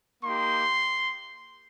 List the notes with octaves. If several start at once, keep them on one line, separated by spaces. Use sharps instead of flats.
A#3 D#4 G4 C6